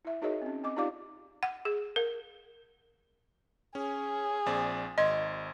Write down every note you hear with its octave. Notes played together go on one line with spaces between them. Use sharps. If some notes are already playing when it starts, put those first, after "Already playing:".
E4 E5
D#4 F#4 G#4 A#4 C#5 D#5
C4 C#4
C4 D#5 D6
D#4 F4 G4 D5 F5 D6
F#5
G#4
A#4
C#4 G#4
A#1 C4 D5
G#1 D#5 C6 G#6